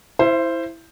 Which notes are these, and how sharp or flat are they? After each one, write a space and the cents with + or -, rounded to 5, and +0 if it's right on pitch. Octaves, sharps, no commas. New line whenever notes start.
E4 +0 C5 +0 E5 +40